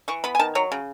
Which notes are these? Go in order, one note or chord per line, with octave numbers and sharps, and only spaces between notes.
E3 C#6
B3 B5
G#5
D#3 A5
F#3 C#5
C#3